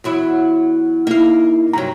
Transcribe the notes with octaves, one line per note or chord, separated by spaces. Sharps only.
E2 F#3 E4
A#3 D#4 E4 F5
G2 C3 F#3 A#5